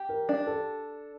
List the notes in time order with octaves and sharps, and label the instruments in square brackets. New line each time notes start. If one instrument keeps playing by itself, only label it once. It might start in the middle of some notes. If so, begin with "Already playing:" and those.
Already playing: [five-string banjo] G4
[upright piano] A#4
[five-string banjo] D4
[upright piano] A4